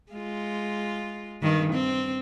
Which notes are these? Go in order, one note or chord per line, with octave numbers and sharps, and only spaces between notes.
G#3 F4
G2 D#3
C4